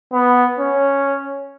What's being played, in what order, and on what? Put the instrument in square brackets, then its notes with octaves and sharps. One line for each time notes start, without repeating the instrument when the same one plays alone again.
[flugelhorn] B3
C#4